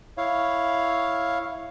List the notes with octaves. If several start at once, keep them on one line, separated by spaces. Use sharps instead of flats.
E4 C#5 F5